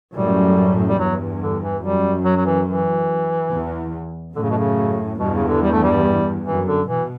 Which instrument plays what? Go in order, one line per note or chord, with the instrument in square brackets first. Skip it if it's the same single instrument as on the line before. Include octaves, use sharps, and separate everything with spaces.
[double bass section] F#2 A2 [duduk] G3
[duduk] G3
[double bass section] E2 G2 [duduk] F#3
[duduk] D3
E3
[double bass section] F#2 [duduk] G3
[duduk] F#3
F#3
E3
E3
[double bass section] E2
[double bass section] F#2 A2 [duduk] D3
[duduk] C#3
B2
C#3
[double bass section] E2 G2 [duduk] B2
[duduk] C#3
D3
G3
A3
G3
[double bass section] F#2 [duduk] E3
[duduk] D3
[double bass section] B2 [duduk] E3